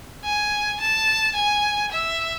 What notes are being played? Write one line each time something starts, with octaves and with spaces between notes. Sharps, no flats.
G#5
A5
G#5
E5